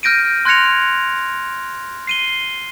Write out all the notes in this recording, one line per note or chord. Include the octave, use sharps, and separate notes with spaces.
F6 G6 A#6 D7 D#7
C6 F#6 G#6 A#6 C#7 F7
C7 D#7 G7